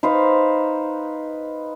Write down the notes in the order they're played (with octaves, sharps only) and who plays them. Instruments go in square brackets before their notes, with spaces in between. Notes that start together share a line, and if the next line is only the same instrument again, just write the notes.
[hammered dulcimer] D#4 B4 C5 F5